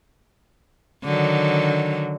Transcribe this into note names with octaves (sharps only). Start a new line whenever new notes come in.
D3 D#3 F#3